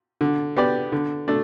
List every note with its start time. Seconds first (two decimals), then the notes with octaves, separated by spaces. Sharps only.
0.21 D3
0.57 B3 G4 D5
0.92 D3
1.28 A3 D4